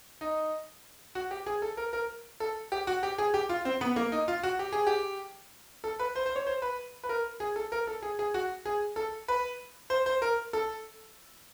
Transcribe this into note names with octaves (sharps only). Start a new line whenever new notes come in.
D#4
F#4
G4
G#4
A4
A#4
A#4
A4
G4
F#4
G4
G#4
G4
F4
C4
B3
A#3
D#4
F4
F#4
G4
G#4
G4
A4
B4
C5
C5
C#5
C5
B4
B4
A#4
G#4
A4
A#4
A4
G#4
G#4
F#4
G#4
A4
B4
C5
C5
A#4
A4